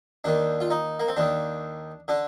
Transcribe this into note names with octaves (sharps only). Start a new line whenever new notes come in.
D#2 D#3 D4
F4
D#4
A#3
C4
D#2 D#3 D4
D3 D4